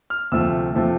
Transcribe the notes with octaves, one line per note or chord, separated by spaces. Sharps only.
F6
D2 C3 F3 A3 E6
C3 F3 A3